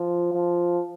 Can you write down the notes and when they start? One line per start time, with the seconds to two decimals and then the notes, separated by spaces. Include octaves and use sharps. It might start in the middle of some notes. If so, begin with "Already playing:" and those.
Already playing: F3
0.34 F3